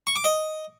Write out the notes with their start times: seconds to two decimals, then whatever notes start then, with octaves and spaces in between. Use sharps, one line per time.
0.07 C#6
0.16 D6
0.24 D#5